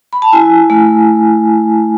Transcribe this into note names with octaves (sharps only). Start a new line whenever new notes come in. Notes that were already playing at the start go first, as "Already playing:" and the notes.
B5
A5
E4 G#5
A3